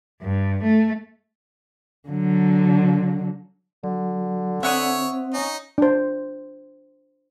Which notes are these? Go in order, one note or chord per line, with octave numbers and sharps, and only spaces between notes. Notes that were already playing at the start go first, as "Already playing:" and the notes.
G2
A3
D3 F#3
D3 F#3
C4 C#5 E5 F#5 D#6
C#4 D#4
D4 C5